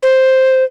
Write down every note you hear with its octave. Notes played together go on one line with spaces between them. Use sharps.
C5